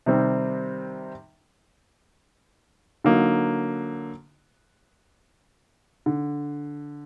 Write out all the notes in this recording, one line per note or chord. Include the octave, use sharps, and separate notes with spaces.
C3 D#3 G3 C4
D3 F#3 A#3 D#4
D3